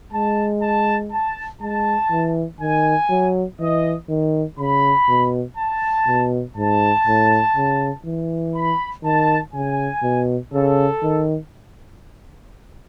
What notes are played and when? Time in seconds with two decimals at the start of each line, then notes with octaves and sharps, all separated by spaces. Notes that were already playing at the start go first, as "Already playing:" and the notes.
0.13 G#3 A5
0.62 A5
1.12 A5
1.61 G#3 A5
2.11 E3
2.60 D#3 G#5
3.10 F#3
3.59 E3 D#5
4.09 D#3
4.58 C#3 B5
5.08 B2
5.57 A5
6.07 B2
6.56 G#2 A5
7.07 A2
7.56 C#3
8.05 E3
8.54 B5
9.04 D#3 A5
9.54 C#3 G#5
10.03 B2
10.53 C#3 A4
11.03 D#3